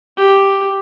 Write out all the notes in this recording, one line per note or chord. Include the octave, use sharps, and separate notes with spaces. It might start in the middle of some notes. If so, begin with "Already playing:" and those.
G4